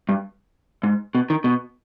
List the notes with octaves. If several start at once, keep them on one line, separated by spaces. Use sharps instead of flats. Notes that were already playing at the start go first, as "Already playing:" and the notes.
G2
G#2
B2
D#3
B2